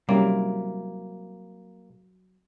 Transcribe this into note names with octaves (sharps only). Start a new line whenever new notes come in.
F#3 G3 A#3 C4 C#4 D#4 E4